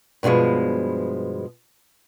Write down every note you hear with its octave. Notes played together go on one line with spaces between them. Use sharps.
G2 B2 D#3 F3 G#3